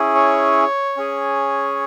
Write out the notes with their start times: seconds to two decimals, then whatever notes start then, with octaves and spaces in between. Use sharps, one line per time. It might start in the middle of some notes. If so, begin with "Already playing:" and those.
Already playing: C#4 E4 G#4
0.15 C#5
0.97 C#4 G#4